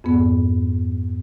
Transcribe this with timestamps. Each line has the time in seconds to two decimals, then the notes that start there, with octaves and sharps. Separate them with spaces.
0.04 F2 G#2 B3